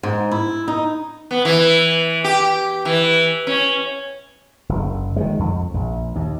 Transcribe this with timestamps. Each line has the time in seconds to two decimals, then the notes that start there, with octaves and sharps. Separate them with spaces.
0.03 G#2
0.31 E4
0.68 D#4
1.31 B3
1.45 E3
2.24 G4
2.85 E3
3.47 C#4
4.69 F#1
5.16 D#3 F#3 G#3
5.39 F2
5.74 A#1
6.15 D#2